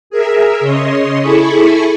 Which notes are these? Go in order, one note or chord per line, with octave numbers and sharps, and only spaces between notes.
G#4 A#4 E5
C#3 C#5 D#5 C6
E4 G#4 A4 G#5 B5 C#6